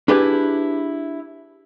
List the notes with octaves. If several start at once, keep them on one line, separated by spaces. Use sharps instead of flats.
D4 E4 G4 G#4 B4